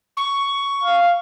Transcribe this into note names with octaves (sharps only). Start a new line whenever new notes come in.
C#6
F5